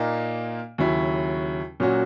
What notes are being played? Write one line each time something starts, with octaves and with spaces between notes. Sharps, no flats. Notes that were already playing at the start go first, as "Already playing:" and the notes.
Already playing: A#2 A#3 D#4
D#2 C#3 F#3 C#4 E4
A#2 F#3 C#4 F#4